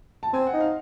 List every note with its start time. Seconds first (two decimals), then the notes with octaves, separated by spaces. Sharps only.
0.23 A5
0.33 C4 G#5
0.47 F#5
0.53 D#4
0.60 F5